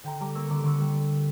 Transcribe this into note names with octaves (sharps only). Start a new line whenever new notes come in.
D3 G5 A#5
G3 A#5 D6
A#3 C#6 E6
D3 A#5 D6
D3 C#6 E6
G3